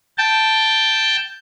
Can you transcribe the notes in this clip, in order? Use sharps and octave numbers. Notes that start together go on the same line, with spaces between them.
G5 A5